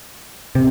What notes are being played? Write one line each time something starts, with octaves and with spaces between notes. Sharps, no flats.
C3